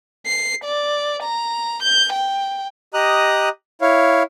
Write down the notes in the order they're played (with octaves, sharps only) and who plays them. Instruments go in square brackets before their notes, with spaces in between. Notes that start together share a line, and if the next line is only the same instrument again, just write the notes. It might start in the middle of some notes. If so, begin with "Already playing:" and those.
[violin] C7
D5
A#5
G6
G5
[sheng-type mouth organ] G4 D#5 A#5 D#6 F#6
E4 C#5 F5